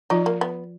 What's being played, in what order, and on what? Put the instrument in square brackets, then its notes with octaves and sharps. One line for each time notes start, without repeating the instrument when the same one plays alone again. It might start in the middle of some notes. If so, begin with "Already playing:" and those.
[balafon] F3 F4 [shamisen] D#4
[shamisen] A#3
B3